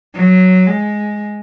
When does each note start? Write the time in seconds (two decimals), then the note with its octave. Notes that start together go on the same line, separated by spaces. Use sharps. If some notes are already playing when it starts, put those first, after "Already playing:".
0.15 F#3
0.67 G#3